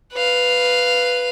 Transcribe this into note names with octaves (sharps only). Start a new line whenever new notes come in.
B4 F5